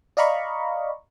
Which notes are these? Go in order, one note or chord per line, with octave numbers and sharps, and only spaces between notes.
D5 D#5 F5 A#5 B5 C#6